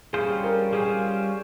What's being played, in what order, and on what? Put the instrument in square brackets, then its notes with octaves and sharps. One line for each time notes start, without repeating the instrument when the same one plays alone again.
[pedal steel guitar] G3 C#4 F4 C5 [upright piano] G#4
[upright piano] A#4
[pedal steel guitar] G3 C#4 F4 C5 [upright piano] G#4